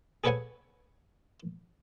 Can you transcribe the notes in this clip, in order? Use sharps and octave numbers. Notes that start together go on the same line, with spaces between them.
G#4 A4 B4 C#5 F#5 G#5